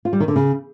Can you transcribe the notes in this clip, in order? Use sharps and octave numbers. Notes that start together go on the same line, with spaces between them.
F4
G3
D#3
D3
C#3